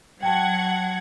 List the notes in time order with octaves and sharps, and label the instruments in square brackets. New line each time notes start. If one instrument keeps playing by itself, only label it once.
[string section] F#3 F#5 G#6 [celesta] G5 A5